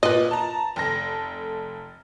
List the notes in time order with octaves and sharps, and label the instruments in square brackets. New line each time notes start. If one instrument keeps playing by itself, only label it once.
[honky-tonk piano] A#2 [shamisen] B4 D#5
[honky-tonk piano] A5 A#5
F1 A4 A#6